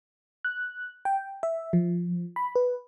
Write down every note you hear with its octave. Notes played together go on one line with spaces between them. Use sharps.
F#6
G5
E5
F3
B5
B4